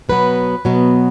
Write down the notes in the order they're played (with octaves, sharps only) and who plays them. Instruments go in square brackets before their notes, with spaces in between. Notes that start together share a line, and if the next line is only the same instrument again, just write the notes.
[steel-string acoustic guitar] B2 F#3 B3 B4
B2 F#3 B3